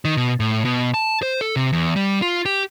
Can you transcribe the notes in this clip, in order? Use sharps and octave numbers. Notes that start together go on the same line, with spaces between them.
D#3
B2
A2
B2
A5
C5
A4
C3
E2
G3
F4
G4